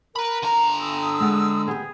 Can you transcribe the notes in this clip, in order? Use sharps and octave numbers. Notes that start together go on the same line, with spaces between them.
A#4 B4 B5
D3 A#5
D#6 E6
G#3 F#5
B3 G4 G#4